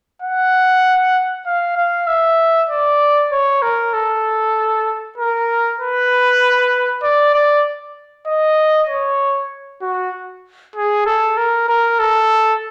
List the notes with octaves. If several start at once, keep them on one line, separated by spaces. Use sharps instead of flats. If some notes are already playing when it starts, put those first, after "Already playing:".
F#5
F5
F5
E5
D5
C#5
A#4
A4
A#4
B4
D5
D5
D#5
C#5
F#4
G#4
A4
A#4
A#4
A4